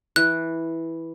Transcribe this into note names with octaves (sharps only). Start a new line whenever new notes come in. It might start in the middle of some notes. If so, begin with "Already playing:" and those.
E3 F#6